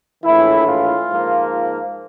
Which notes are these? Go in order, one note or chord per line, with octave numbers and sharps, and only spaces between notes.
A#1 A2 E3 E4
F4
G#2 F3 A#3